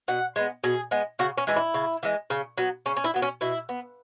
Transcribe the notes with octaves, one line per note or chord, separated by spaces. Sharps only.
B2 F#5
G#3 B3
B2 G#4
G#3 B3
C#3 F#4
C#4
E3 G#3
E4
C#3
E3 G#3
C#3
F#3 B3
C#3 C#4
C#4
E4
F#3 B3
C#4
B2 E4
B3